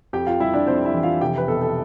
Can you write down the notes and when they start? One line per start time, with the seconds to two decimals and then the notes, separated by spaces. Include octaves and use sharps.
0.13 F2 G4 G5
0.27 F4 F5
0.40 G3 E4 E5
0.53 D4 D5
0.67 F2 C4 C5
0.85 E4 E5
0.94 E3
1.03 F4 F5
1.21 F1 G4 G5
1.38 B4
1.48 B2 A4
1.62 A4